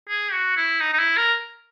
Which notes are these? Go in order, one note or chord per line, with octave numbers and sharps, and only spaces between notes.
G#4
F#4
E4
D#4
D#4
E4
A#4